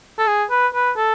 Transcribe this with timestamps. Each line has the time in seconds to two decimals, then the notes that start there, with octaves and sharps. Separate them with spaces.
0.18 A4
0.27 G#4
0.50 B4
0.74 B4
0.97 A4